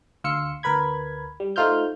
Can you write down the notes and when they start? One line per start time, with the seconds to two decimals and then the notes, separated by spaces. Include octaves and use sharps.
0.24 D2 F5 C6 E6 C#7
0.63 D2 A#4 B4 B5 G#6
1.40 G3
1.56 A3 D#4 F4 C5 F6 G6